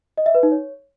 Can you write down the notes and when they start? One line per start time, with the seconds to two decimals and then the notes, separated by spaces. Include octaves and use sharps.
0.18 D#5
0.26 E5
0.35 B4
0.43 D#4
0.52 C#5